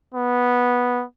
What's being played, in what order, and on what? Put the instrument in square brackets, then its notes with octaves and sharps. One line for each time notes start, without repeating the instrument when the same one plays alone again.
[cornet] B3